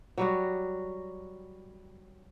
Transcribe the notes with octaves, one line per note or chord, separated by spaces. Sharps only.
F#3 G3 F#4